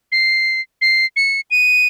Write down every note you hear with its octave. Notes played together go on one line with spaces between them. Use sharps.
C7
C7
C#7
D#7